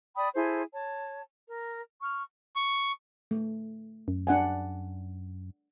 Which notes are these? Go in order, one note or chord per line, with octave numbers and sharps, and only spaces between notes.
D5 G5 B5 D#6
E4 G#4 A4 C5
C#5 A5
A#4
C#6 F6
C#6
A3
F#2
D4 F#5 G#5